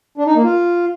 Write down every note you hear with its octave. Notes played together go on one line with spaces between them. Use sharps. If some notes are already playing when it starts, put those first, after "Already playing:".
D4
D#4
A#3
F4